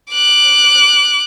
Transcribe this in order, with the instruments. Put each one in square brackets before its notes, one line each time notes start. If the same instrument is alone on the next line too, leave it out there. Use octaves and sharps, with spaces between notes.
[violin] D6 F#6